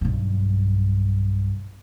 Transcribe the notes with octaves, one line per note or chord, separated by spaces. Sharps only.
B1 G2